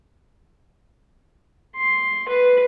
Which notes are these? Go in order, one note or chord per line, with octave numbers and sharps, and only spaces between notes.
C6
B4